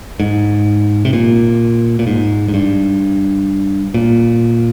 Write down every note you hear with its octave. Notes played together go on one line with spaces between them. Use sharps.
G#2
C3
A#2
A#2
G#2
G#2
G2
A#2